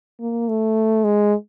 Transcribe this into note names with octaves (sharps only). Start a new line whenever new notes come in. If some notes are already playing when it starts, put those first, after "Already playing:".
A#3
A3
G#3